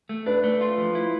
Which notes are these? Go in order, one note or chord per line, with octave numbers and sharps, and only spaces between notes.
A3
D4 B4
A3
F4
F3
E4